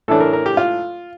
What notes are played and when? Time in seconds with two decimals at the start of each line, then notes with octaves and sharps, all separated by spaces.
0.08 A2 E3 A3 D4 A4
0.20 A#4
0.33 A#4
0.46 G4
0.57 F4